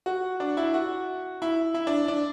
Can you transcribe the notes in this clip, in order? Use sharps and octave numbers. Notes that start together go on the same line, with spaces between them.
F#4
D4
E4
F#4
E4
E4
D4
D4